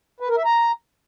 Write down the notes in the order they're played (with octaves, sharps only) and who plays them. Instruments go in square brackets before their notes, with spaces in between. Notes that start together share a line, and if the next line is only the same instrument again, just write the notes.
[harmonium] B4
A#4
E5
A#5